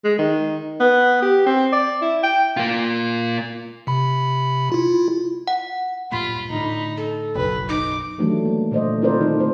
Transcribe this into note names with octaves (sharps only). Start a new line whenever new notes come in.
G#3
D#3
B3
G4
C4
D5
E4
G5
A#3 F4
C3 B5
E4 F4
F#5
D1 G2 A#2 F4 B5
A2 D3 D#4
A4
F#1 B1 F#2 B4
D#4 D6
D#3 E3 F#3 G3 A3 D4
A#3
A#2 D3 A3 C5 D5 D#5
C4 E4 F4 A#4 C5 D5
D#3 D#4 A4
D3 A3 C5